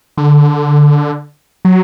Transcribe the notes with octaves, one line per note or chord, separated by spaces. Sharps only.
D3
F#3